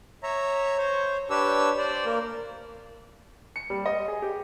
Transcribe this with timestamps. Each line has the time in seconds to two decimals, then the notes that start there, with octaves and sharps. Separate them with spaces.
0.23 C#5 E5 A#5
0.78 C5 C#5
1.30 D4 G4 B4 C#5 E6
1.78 C5 D5
2.06 A#3 A#4
3.56 C#7
3.70 G3
3.86 D#5
4.08 G#4
4.22 G4